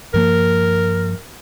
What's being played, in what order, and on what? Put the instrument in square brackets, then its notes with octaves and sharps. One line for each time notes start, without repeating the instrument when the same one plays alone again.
[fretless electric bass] G2 F3 A#3 [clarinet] A#4